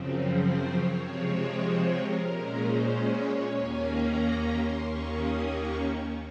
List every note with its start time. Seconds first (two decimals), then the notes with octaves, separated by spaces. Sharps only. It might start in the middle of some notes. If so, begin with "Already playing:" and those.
Already playing: F#2 C#3 F3 C4
0.35 C5
0.67 C#5
0.98 C3 F3 G#3 C4 C#5
1.95 A#4
2.26 A#2 G#3 C#4 A#4
2.58 C5
2.90 C#5
3.53 D#2 D#3 A#3 C#4 G#5
3.85 A#5
4.49 C6
4.79 D#2 D#3 A#3 C#4 C#6
5.12 D#6
5.44 C#6